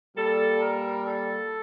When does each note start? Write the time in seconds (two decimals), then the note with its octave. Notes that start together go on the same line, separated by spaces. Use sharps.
0.16 A#2 G3 A4
0.60 A#4
1.04 A4